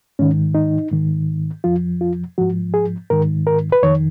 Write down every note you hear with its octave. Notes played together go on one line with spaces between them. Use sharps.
G#2 D#3 C#4
D#4
G#2 D#3
F2 F3 F4
F4
G#2 F3 F#4
G#4
G#2 D#3 A#4
A#4
B4
F2 D#3 C#5